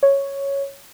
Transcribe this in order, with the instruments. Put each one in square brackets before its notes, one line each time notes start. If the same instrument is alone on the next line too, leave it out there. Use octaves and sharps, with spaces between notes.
[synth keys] C#5